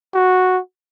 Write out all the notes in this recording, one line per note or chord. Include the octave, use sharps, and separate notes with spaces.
F#4